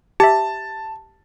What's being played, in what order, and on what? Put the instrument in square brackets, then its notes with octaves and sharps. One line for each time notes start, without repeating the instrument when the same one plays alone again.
[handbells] G4 E5 [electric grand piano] A5